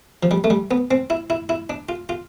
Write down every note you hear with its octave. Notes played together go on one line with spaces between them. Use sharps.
F3
G3
A3
G3
B3
C4
E4
E4
E4
D4
F4
F4